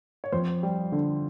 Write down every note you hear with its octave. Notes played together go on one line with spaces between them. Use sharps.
C#5
F2 C5
G3
D3